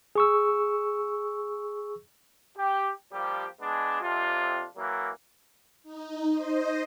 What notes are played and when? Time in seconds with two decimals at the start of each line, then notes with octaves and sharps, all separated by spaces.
0.15 G#4 C#6 E6
2.57 G4
3.12 F3 G3 A#3 G4
3.61 G#3 B3 D4
4.02 F2 C3 D4 F4
4.77 E3 F#3 A#3
5.83 D#4
6.32 C5 D#5